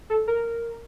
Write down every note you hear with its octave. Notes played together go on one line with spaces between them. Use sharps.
A4
A#4